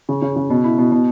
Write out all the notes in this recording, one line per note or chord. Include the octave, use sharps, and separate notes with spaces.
C#3
C#3
C#3
B2
E4
B2
B2